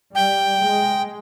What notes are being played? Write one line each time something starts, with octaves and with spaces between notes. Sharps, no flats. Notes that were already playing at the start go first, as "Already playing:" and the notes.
G3 G5
G#3